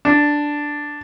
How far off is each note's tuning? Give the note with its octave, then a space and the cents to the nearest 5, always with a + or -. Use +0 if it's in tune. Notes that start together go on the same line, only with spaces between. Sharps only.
D4 +0